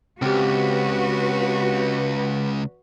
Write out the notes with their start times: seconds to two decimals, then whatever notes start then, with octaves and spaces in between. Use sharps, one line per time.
0.22 C#2 C4 F#4 G4 B4